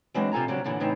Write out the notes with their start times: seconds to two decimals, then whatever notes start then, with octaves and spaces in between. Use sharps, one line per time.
0.14 E3 F#3 G#3 C4 D4
0.32 C3 F4 A4 G#5 A#5
0.48 C#3 F#3 G3 C4 D4
0.64 F#2 A#2 D3 E3
0.80 A2 C#3 E3 C4 D4 D#4